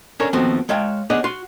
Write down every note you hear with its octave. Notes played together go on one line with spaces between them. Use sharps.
C#4 D4 A4 A#4 C#5
D#2 F3 B3 C4 F#4 A4
G#3 C#5 F5 G5 A5
B3 D4 G#4 C#5 D#5 F#5
F#4 C6